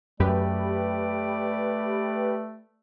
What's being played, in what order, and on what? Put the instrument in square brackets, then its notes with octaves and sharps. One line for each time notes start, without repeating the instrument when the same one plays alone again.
[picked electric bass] F#2 [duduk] A3 [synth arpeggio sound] G4 B4 [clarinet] D5